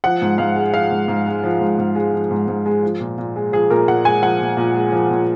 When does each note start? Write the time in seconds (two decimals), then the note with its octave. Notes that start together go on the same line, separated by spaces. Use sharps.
0.04 F3 F#5
0.22 G#2
0.38 G#2 F5
0.56 G#3
0.73 F3 F5
0.91 G#2
1.08 G#2
1.26 G#3
1.43 F3
1.61 G#2
1.78 G#2
1.95 G#3
2.13 F3
2.31 G#2
2.48 G#2
2.66 G#3
2.83 F3
3.00 A#2
3.18 A#2
3.36 G#3
3.52 F3 G#4
3.70 A#2 A#4
3.88 A#2 F#5
4.05 G#3 G#5
4.22 F3 F#5
4.41 A#2
4.57 A#2
4.74 G#3
4.92 F3
5.10 A#2